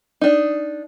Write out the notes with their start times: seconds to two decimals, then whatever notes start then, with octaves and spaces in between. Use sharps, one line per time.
0.21 D4 D#4